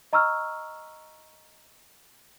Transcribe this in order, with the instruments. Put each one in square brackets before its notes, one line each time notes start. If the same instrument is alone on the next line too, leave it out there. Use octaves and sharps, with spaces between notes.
[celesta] D#5 A#5 C#6 E6 F6